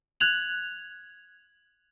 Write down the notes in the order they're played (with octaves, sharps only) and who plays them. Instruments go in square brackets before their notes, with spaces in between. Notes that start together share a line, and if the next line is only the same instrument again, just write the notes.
[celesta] F#6 G#6 F7 F#7